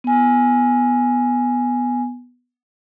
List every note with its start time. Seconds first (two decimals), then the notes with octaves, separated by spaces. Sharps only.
0.04 B3 G#5